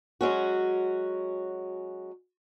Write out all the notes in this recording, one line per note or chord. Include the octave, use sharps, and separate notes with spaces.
F#3 G#3 C#4 F#4